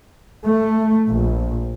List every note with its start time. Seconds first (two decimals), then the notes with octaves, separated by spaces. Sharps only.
0.46 A3
1.08 A#1